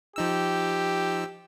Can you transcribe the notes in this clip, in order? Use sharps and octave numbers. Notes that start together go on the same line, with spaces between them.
F3 D#4 G4 E6